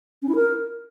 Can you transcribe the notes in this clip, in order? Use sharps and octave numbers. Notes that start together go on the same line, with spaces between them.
C#4
E4
A#4